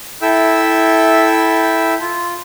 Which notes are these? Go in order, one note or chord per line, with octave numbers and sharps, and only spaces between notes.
E4 A4 E5 G5 E6
F4